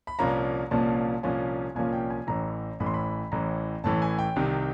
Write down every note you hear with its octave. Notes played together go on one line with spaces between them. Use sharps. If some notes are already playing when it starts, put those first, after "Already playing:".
B5
C2 A#2 F3 A#3 C#4 A#5
C2 A#2 F3 A#3 C#4 A5
C2 A#2 F3 A#3 C#4 G#5
C2 A#2 F3 A#3 C#4 G#5
G5
G#5
A1 A2 E3 A#5
A1 A2 E3 B5
C6
B5
A1 A2 E3 A#5
A1 A2 E3 A5
G#5
G5
C2 C3 D#3